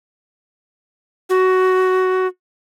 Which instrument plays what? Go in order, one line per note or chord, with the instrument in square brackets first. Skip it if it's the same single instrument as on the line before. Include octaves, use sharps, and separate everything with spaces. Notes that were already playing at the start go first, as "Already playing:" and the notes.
[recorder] F#4